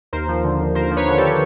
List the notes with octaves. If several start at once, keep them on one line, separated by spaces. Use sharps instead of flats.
D#2 A#4 C5
F3
D3
D#2
D#2 A#4 C5
F3
B4 C#5
D3
G4 A4